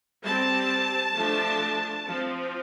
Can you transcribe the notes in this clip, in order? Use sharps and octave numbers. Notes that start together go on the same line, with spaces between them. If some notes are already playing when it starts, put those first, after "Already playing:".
G3 C4 A5
F3 A3 D4
F3 C4